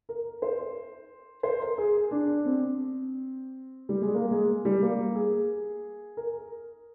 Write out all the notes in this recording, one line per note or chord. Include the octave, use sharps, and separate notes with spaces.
A#4
C5
C5
A#4
G#4
D4
C4
G3
G#3
A#3
G#3
G3
A#3
G#4
A#4